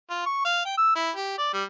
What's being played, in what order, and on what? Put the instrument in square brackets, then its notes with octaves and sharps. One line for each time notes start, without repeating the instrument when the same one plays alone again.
[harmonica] F4
C#6
F5
G5
E6
E4
G4
D5
G3